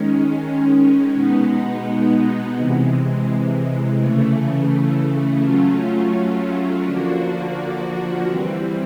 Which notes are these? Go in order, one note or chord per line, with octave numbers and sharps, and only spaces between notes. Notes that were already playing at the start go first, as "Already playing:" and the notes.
Already playing: D#3 G#3 C#4
B2 G#3 B3 D#4
C3 E3 G#3
C#3 E3 A3
F#3 A3 C#4 F4
D3 F3 A#3 D4 F#4
E3 G3 C4